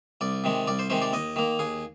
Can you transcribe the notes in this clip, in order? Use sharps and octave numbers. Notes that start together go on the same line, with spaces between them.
C2 D5
C3 D#3 G#3
C2 D5
C5
C3 D#3 G#3 C5
D5
D#2 D#5
D#3 A#3
D#2 G#4